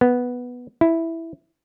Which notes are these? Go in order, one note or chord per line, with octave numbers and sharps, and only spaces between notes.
B3
E4